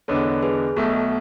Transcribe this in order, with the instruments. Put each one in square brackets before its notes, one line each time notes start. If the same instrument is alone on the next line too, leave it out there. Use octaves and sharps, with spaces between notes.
[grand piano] E2 D3 G#3 B3 D4 [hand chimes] A4 C#5
[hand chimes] G#4 B4
[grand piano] B1 B2 A3 [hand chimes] F#4 A4